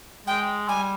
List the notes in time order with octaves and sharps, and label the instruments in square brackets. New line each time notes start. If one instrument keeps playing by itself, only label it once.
[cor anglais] G#3 [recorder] G5
[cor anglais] G3 [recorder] G#5